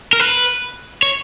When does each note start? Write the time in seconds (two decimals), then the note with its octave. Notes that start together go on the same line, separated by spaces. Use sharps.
0.13 A#4
0.20 B4
1.03 C#5